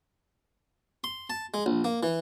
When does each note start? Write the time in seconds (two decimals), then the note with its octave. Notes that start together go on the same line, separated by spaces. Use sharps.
1.04 C6
1.30 A5
1.54 G#3
1.66 A#1
1.84 A#3
2.03 E3